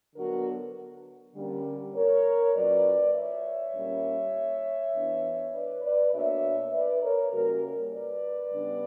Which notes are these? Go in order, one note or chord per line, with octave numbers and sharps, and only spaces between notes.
D3 F#3 B3 F#4 A#4
D3 G3 A#3 C#4
A#4 C#5
A#2 F#3 C#4 B4 D5
C#5 E5
A#2 G3 A#3 C#4
E3 B3 D4
B4 D5
B4 D5
B2 A#3 D4 C#5 E5
B4 D5
A#4 C#5
C#3 G3 A#3 C#4 F#4 A#4
B4 D5
C#3 G3 B3 D4